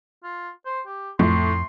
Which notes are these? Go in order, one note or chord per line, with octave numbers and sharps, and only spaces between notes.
F4
C5
G4
F2 A2 C6